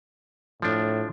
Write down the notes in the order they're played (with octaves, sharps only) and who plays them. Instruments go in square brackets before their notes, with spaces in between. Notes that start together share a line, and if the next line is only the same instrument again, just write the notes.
[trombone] A2 [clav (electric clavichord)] F3 D4